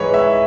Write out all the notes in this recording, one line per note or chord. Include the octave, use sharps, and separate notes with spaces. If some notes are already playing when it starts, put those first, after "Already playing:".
Already playing: G#2 E3 G#3 B4 C#5
E5